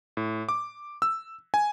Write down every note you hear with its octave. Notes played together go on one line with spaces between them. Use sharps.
A2
D6
E6
G#5